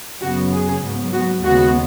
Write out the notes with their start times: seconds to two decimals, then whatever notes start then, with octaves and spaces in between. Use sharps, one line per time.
0.21 F#2 C#3 F#3 B3 F#4
0.52 G#4
0.83 G#2 F#3 B3
1.14 F#4
1.44 D#2 C#3 G#3 B3 F#4